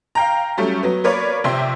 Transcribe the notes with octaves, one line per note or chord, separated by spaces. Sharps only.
F5 G5 A#5
F#3 G3 A3 C#4
F#3 B3
A#3 A#4 B4 C#5 D5
A#1 C3 E5 G5 C6